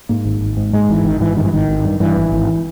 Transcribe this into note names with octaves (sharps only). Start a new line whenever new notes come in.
G#2 A#3
G#1
G#1
G#2
G#2 G#3
G#1 E3
G#1 D#3
G#2 E3
G2 D#3
E3
G#1 D#3
G#1
G2
G2 E3
G#1
G#1